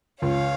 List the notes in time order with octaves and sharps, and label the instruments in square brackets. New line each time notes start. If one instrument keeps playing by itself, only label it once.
[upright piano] C#2 [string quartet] C#5 F5